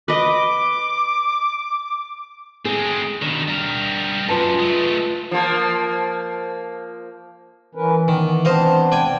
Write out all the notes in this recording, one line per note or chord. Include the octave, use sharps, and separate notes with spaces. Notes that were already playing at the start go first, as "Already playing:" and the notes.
B4 D#5 D6
G#3 C4 G#4
B2 D#3 D4
G3 A#4
F#2 F4 B4 A5
G#3 A3
F3 A#3
E3 C#4 A#4 B4
D#3 B3
B3 C4 D4 C5 D#5 F5
D5 G5 G#5